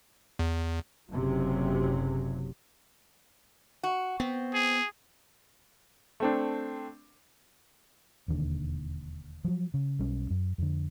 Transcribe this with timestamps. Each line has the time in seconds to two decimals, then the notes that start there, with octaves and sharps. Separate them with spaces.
0.39 E2
1.12 F#1 C3 F#3
3.83 F#4
4.20 B3 C4
4.54 G#4
6.20 A3 C4 D4
8.28 E1 D#2 D3 D#3
9.44 F3 F#3
9.74 C#3
9.99 B1 G3 C#4
10.30 F#2
10.58 F2 D3